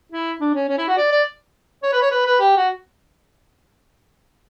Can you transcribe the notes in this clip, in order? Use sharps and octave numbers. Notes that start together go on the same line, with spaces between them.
E4
D4
C#4
C#4
E4
F#4
D5
D5
C#5
B4
C#5
B4
B4
G4
F#4